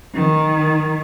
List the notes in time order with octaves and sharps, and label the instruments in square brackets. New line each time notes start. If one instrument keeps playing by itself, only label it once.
[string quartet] D#3